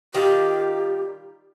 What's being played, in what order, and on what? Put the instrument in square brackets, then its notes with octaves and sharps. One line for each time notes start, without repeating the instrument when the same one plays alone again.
[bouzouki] D#3 G3 F4 [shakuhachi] G4